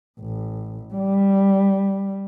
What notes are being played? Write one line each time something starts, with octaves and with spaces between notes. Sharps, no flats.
A1
G3